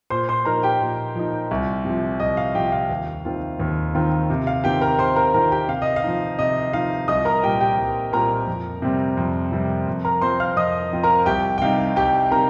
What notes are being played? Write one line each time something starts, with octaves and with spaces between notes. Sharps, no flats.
A#2 C5 C6
C5 C6
F3 D#4 A#4 A#5
G4 G5
A#2
F3 D#4
C2
C3 F3
C2 D#5
F5
C3 F3 G4 G5
F5
D#2
D#3 C4 F4
D#2
D#3 C4 F4
C3
F5
D#3 C4 F4 G4 G5
A#4 A#5
C3 C5 C6
A#4 A#5
D#3 C4 F4 A#4 A#5
G4 G5
C3 F5
D#5
F5
F3 D#4
C3 D#5
F3 D#4 F5
C2 D#5 D#6
A#4 A#5
A#2 G3 C4 G4 G5
G4 G5
C2
A#2 G3 C4 A#4 A#5
F2
C3 G3 C4
F2
C3 G3 C4
F2
A#4 A#5
F3 C4 F4 C5 C6
F5 F6
F2 D#5 D#6
F3 C4 F4
A#4 A#5
C2 G4 G5
G5
C3 G3 D#4 F5
C2 G4 G5
C3 G3 D#4 A#4 A#5